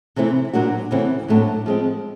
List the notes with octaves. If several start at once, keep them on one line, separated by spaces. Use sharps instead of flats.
C3 E3 A3 C4 E4
A#2 F#3 A#3 D4 F#4
D2 C#3 E3 A3 C4
A2 F#3 A3 D4
F3 G#3 C4